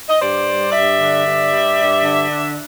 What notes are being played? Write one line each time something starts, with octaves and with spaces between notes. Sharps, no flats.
D#5
G2 C5 D5
G3
G2 D5 E5
D3
G2
G3
G2
D3
D4